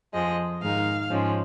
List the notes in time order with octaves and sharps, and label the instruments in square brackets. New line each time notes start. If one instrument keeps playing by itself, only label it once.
[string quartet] F2 F3 G#3 D#5
G#2 D#3 G#3 D#4 F5
G#2 F3 G#3 C#4